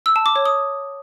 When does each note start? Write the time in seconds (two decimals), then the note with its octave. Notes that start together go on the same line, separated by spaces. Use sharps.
0.06 E6
0.16 A5
0.26 D6
0.36 C#5
0.45 D#6